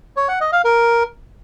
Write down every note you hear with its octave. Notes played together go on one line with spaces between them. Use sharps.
C#5
F#5
D#5
F5
A#4